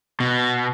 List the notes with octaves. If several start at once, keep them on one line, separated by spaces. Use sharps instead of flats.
B2